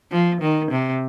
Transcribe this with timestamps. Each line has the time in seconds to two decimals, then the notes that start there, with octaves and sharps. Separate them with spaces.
0.12 F3
0.41 D#3
0.71 C3